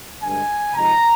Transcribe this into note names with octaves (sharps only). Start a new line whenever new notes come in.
G2 D3 G#3 G#5
C3 F3 G#3 D#4 A#5